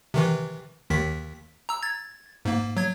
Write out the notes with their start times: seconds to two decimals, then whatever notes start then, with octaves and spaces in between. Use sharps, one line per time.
0.14 C3 D#3 E3
0.90 D#2 D#3 B6
1.69 A#5 E6
1.83 G#6 A6
2.45 G#2 A#3
2.77 F#3 G#6